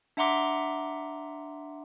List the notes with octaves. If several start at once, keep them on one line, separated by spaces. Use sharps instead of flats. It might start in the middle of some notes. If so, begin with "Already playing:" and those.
D4 E5 F#5 A#5 C6 D6